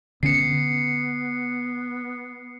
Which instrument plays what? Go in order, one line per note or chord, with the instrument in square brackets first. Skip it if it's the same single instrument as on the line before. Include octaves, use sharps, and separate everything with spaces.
[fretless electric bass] D3 C#4 [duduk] B3 [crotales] C7 C#7